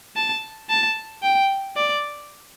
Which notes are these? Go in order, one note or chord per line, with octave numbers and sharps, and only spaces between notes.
A5
A5
G5
D5